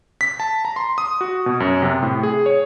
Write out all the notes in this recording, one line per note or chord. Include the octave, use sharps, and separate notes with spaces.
B6
A5
A#5
C6
D#6
F#4
B2
F#2
C3
A2
G#4
C#5